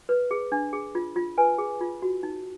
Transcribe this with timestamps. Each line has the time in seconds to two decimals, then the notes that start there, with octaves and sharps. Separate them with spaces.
0.09 B4
0.31 G#4
0.52 D4
0.73 G#4
0.95 F4
1.16 F4
1.38 B4 G#5
1.58 G#4
1.81 F4
2.02 F#4
2.23 D#4